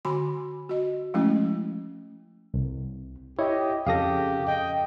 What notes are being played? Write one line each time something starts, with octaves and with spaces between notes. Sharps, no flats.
D3 F#4 G#5 B5 C6
F#4 D#5
F3 G#3 A3 C#4 E4
C2
E4 G4 C#5 D#5
F2 C#3 G4 A4 F5 D#6 A#6
D#5 G5